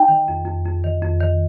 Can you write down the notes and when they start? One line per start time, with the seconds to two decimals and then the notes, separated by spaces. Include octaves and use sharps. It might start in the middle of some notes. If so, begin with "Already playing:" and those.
Already playing: D#4 G5
0.08 D#3
0.28 F2
0.46 F2
0.65 F2
0.84 D#3
1.02 F2
1.20 D#3